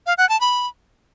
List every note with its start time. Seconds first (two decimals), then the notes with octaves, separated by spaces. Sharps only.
0.06 F5
0.18 F#5
0.29 A5
0.41 B5